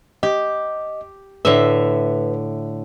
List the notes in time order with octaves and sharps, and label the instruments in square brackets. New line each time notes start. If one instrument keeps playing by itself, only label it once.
[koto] G4 [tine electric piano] D#5
[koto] A2 D3 E5 [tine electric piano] B4